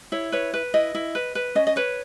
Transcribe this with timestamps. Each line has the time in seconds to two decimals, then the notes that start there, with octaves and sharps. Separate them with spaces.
0.12 E4 C#5
0.32 B4 C#5
0.54 B4
0.74 E4 D#5
0.95 E4
1.15 B4
1.35 B4
1.55 C#4 D#5
1.67 D#5
1.76 B4 C#5